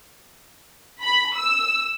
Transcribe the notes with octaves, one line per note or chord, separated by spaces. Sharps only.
B5
E6